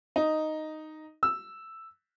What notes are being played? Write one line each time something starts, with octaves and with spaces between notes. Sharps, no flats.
D#4
E6